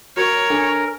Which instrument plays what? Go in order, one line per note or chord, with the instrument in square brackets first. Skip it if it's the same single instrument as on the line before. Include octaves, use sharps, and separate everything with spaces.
[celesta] F#4 [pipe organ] A#4 [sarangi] C#5
[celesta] D4 A4 G#5